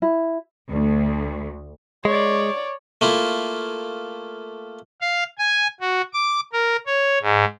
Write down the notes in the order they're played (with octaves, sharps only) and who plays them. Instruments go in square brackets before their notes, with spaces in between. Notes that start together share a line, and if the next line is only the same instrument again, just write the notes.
[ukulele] E4
[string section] D2
[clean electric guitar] G#3 [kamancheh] C#5 D5
[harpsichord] A3 A#3 E4 F4
[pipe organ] F5
G#5
F#4
D6
A#4
C#5
G#2